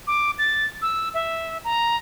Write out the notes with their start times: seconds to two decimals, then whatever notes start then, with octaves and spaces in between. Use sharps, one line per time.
0.07 D6
0.39 A6
0.82 E6
1.14 E5
1.64 A#5